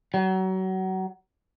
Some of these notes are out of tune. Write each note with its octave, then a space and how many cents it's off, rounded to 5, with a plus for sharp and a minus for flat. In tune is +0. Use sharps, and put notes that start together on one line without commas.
F#3 +30